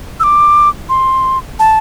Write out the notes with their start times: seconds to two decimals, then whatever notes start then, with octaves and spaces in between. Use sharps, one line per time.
0.20 E6
0.23 D6
0.89 C6
1.59 A5